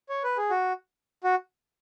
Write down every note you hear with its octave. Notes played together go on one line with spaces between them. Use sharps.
C#5
B4
G#4
F#4
F#4